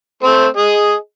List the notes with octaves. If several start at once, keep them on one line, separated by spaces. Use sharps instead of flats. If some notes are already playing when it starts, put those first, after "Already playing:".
A3 C4 C5
G#4 D#5